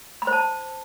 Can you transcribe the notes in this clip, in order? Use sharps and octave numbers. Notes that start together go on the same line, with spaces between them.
B5
C5
A5